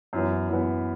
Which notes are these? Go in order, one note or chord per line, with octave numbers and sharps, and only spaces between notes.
F#2 E3 B3
F#2 E3 B3